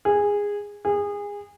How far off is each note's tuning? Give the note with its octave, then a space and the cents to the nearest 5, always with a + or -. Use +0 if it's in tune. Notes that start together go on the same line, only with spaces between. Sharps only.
G#4 -15
G#4 -25